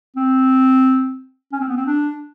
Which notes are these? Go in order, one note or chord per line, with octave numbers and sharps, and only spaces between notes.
C4
C#4
C4
B3
C4
D4